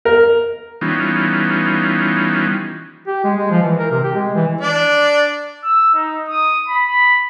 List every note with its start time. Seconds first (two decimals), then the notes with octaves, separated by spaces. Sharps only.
0.05 A#4
0.81 E3 G3 B3 C#4 D#4 F4
3.07 G4
3.24 G#3
3.37 G#3
3.51 F3
3.63 E3
3.79 A#4
3.91 C3
4.03 G4
4.15 G#3
4.35 E3
4.61 D4 D5
5.64 E6
5.95 D#4
6.29 D#6
6.68 B5